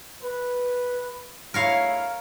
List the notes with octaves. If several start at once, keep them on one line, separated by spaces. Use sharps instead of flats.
B4
G#2 A3 E4 A#4 C#5 F5